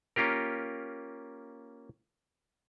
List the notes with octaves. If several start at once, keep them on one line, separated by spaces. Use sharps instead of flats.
A#3 C#4 F4 G4 A#4